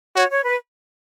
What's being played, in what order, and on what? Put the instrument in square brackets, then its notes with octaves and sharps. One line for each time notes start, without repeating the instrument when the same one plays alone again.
[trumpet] F#4 [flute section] C#5
[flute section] C#5
B4